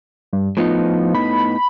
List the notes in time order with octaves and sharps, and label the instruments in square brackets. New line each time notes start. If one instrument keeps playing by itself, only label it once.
[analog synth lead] G2
[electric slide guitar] A2 B3 D#4 [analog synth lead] F3
[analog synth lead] B5